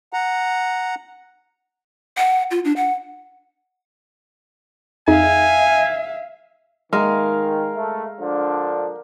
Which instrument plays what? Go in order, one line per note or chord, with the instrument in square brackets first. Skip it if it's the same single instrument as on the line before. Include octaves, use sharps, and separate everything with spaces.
[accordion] F#5 A#5
[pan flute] F#5
F4
D4
F#5
[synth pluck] F2 D#4 G#4 [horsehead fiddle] E5 F5 [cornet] G#5
[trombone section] D#3 [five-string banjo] G#3 [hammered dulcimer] A#4 F5
[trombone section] A3
D3 F3 D4